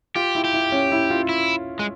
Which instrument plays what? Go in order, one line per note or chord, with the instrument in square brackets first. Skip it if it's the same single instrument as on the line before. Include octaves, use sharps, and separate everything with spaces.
[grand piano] F4 [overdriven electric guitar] G4
[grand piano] E4
[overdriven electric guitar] G4
[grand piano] E4
C#4
E4
F4
[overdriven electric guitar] E4
G#3